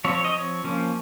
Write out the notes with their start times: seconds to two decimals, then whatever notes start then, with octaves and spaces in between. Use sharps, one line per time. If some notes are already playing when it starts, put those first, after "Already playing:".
0.04 F3 C4 C#5
0.15 C#5
0.24 D#5
0.34 C#5
0.64 F3 A#3 C#4